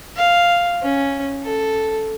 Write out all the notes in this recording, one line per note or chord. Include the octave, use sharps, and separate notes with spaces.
F5
C#4
A4